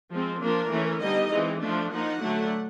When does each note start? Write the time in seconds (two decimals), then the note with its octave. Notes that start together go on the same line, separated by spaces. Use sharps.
0.12 F3 G#3 C4
0.42 F3 A#3 D4 A#4
0.72 E3 A3 C#4
1.02 D3 G3 B3 D#4 D#5
1.33 E3 G#3 C4
1.62 F3 A3 D4
1.92 F3 A#3 D#4 F#5
2.22 D3 F#3 A3 D4